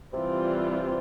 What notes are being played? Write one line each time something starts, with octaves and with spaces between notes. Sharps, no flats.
C3 E3 G3 C4 F4